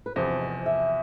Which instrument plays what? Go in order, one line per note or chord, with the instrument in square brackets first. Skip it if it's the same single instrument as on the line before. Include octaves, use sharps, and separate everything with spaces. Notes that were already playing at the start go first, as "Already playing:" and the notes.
[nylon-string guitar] B4
[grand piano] E2 C3 F3 [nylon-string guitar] C5
[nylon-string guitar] D#5
E5